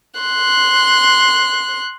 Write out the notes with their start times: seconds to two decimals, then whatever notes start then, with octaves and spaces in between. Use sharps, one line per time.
0.20 C6 F#6